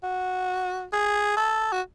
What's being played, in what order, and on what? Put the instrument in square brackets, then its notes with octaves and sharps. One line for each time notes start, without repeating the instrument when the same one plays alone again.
[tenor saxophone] F#4
G#4
A4
F#4